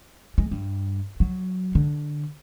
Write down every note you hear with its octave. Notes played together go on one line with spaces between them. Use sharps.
G#3
G2
F#3
D3